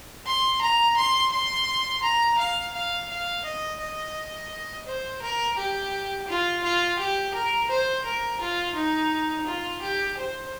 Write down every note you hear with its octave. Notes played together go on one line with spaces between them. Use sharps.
C6
A#5
C6
C6
A#5
F5
F5
F5
D#5
D#5
C5
A#4
G4
F4
F4
G4
A#4
C5
A#4
F4
D#4
F4
G4
C5